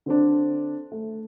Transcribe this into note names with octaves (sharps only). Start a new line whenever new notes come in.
D3 C4 D4
A3